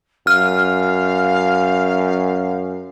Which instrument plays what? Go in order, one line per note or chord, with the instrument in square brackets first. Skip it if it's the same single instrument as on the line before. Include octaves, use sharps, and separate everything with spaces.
[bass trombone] F#2 [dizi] F5 [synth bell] F6